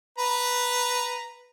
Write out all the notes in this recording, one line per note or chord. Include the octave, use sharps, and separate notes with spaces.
B4 A#5